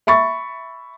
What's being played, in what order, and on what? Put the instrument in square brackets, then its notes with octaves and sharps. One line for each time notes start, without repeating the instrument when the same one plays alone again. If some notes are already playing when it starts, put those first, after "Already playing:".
[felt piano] E5 B5 C#6 A6